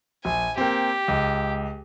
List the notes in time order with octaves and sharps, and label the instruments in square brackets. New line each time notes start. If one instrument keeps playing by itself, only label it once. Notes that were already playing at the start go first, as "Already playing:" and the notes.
[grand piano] A#1 [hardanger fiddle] G#5
[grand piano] A#3 C4 [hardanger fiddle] G4
[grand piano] C#2